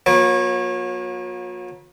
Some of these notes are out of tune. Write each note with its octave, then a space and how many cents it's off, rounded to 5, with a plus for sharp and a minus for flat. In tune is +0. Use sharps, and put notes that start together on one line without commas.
F#3 -45 A#3 +45 C#5 -25